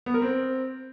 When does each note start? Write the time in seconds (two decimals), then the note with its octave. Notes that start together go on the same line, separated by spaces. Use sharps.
0.06 B3
0.14 A#4
0.22 C4